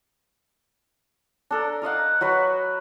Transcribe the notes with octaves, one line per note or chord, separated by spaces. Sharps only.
D4 A4 A#4
A#4 D#5 F5 F#5
F#3 F#4 B4